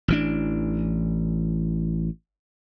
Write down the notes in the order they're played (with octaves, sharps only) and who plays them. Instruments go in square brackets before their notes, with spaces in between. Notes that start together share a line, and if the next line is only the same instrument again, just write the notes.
[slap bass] A1 E3 D4